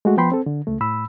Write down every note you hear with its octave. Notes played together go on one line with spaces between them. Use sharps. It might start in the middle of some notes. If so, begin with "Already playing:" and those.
G#3 A3 F#4
F3 B3 G5 B5 C6
C4 A4
D3
C#2 A3
A2 B5 E6